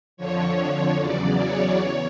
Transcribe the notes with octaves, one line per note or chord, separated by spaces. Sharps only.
F2 D3 F3 C#5
E2 C#3 F#3 D5
C#5
E2 C#5